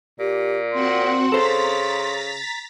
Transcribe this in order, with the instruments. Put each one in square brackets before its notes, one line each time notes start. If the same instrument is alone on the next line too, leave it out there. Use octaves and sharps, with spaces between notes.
[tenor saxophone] A#2 [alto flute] G4
[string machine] C4 F#4 F#5 [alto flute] C6
[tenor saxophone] C#3 [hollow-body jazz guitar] A4 C5 [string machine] A#5 A6 B6